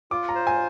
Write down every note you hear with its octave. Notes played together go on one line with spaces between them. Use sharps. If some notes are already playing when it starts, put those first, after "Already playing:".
F4 D6
A#5
C5
G#5